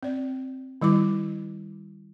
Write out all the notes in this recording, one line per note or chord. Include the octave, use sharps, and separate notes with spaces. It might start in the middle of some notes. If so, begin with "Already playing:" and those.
C4 D5
D#3 G3 E4 D6